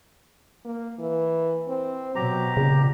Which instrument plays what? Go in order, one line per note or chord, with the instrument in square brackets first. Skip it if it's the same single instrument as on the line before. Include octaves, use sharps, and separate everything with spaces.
[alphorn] A#3
E3
C4
[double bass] B2 [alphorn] F#3 [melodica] G4 A#5
[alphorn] A#2 [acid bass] C#3